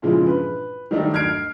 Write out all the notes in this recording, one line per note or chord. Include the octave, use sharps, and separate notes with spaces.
G2 A#2 C#3 E3 F3 G#3
B4
D#3 F#3 G3 A3 D4 D#4
F6 G#6 C7 D7